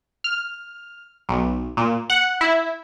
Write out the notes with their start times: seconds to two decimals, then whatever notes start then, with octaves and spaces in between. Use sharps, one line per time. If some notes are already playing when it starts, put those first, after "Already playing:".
0.24 F6
1.29 B1
1.77 A#2
2.10 F#5
2.41 E4